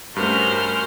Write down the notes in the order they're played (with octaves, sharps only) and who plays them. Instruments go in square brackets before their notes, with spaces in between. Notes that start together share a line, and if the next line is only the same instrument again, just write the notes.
[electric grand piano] G2 A3 [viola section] C#4 F#4 A#4 [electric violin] C5 F6